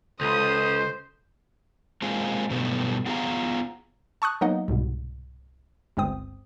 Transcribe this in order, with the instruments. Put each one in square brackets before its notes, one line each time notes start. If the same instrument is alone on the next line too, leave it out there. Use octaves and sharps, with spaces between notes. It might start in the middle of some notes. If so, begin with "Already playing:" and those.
[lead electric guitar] C#2 [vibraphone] A4 [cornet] C5 [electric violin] D#6
[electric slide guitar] G#3 A#3 C4 F4 G#4
G2 B2 F#3 G3 A3 B3
B3 F4 G#4 F5 A#5
[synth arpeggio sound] A5 C#6 D#6 F#6
F#3 A#3 B3 D#4 D#5 F#5
C2 G#2 B2
G1 C#2 G2 C4 D#6